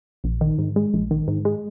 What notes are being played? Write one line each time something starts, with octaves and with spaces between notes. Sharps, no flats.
A#1
D#3
G#2
G#3
A#1
D#3
G#2
G#3